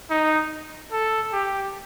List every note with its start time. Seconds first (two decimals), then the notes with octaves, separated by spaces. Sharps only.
0.10 D#4
0.92 A4
1.33 G4